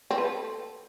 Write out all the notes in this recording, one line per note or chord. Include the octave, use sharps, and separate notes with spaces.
C4
B4
A4